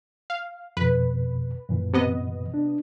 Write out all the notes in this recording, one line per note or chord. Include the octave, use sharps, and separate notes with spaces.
F5
F2 B2 B4
F#2 A#2 E3
C3 B3 D#5
D4